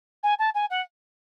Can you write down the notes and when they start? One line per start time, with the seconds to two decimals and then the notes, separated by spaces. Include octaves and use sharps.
0.23 G#5
0.39 A5
0.54 G#5
0.70 F#5